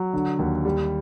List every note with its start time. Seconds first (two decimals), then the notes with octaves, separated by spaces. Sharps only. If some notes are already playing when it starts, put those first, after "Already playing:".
Already playing: F#3
0.14 D3
0.39 D#2
0.65 G3